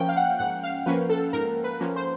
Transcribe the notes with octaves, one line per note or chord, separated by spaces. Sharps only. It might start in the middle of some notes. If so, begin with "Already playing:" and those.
Already playing: F3 A#3 C#4 G5
F5
F#5
G#2 F#5
F5
F3 A#3 C#4 B4
A4
G#2 A#4
B4
F3 A#3 C#4
C5